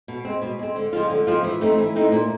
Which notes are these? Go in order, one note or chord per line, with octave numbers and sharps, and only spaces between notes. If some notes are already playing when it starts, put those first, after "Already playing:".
B2
G#3 C4
B2
G#3 C4
D3
F3 G#3 C4 F4
D3
F3 G#3 C4 F4
E3
A3 C4 D#4
E3
A3 C4 D#4
A#2